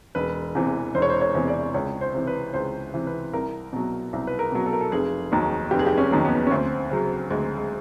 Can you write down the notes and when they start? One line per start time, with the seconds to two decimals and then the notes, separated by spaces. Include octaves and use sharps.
0.15 E1 B4
0.55 E2 C3 E3
0.95 E1 C5
1.02 C#5
1.10 C5
1.21 C#5
1.35 E2 C3 E3
1.48 D5
1.74 C#2 C#5
2.01 C5
2.14 C3 E3
2.27 B4
2.54 C#2 C5
2.94 C3 E3
3.07 B4
3.33 C2 A#4
3.73 B2 F#3
4.13 C2
4.27 B4
4.39 A#4
4.52 B2 F#3
4.66 A4
4.73 A#4
4.81 A4
4.92 F1 G#4
5.32 D#2 D#3 F#3
5.71 F1 G4
5.79 G#4
5.87 G4
5.98 C#4
6.11 D#2 D#3 F#3
6.25 B3
6.47 C#4
6.51 D2 C4
6.90 C#3 F#3
7.30 D2 G#3
7.57 G#3